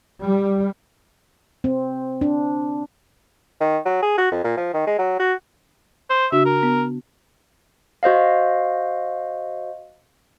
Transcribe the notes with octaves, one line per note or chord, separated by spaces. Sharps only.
G3
C4
D4
D#3
F#3
G#4
F#4
F2
A#2
F3
D#3
G#3
F#3
F#4
C5
C#3 D4 F#4 E5
A#4
B3
F#4 C5 D#5 F5